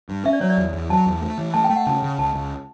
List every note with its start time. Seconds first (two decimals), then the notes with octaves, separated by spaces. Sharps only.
0.09 G2
0.25 C#4 E5
0.33 D5
0.41 F#3 C#5
0.50 D5
0.57 E2
0.73 E2
0.90 F#3 A5
1.06 E2
1.22 A3
1.38 E3
1.54 A3 A5
1.64 G5
1.70 A3
1.76 F#5
1.87 C#3 A5
2.02 C#3
2.18 C#2 A5
2.34 C#2